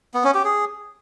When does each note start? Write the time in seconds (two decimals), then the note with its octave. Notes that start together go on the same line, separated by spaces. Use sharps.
0.14 B3
0.24 C#4
0.34 G4
0.45 G#4